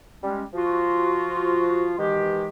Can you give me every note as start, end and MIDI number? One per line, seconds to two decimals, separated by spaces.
0.23 0.43 55
0.23 0.43 56
0.23 0.43 61
0.54 1.93 53
0.54 1.93 65
0.54 1.93 66
1.98 2.47 47
1.98 2.47 51
1.98 2.47 52
1.98 2.47 56
1.98 2.47 67